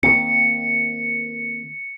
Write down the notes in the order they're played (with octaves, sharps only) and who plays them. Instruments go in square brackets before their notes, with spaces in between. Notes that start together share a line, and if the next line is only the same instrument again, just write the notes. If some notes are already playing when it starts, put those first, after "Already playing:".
[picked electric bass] D#3 A#3 C4 [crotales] C#7